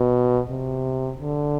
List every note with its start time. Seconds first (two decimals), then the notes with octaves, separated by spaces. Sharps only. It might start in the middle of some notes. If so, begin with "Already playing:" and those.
Already playing: B2
0.50 C3
1.19 D3